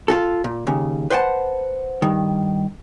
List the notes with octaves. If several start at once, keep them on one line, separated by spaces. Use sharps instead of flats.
F4 F#4 A4
A#2
D#2 C#3
B4 C5 F#5 G5 A5
G2 D#3